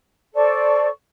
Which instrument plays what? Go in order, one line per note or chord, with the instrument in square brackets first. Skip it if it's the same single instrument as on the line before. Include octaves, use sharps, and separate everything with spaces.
[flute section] A4 C5 D5 C#6